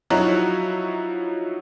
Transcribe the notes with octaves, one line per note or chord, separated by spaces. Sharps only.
F3 F#3 D#4 E4 F#4 C#5